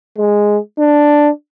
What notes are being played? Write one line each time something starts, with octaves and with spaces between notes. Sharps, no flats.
G#3
D4